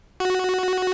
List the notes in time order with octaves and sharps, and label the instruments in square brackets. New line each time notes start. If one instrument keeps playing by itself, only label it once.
[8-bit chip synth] F#4